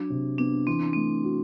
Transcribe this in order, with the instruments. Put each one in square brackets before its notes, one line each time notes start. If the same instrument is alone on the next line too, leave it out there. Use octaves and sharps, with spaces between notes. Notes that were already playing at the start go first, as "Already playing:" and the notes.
Already playing: [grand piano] F#3 [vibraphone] D4
[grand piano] C3
[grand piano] B3 [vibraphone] D4
[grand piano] E3 [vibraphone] C4
[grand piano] A3 [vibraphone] C4
[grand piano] F#4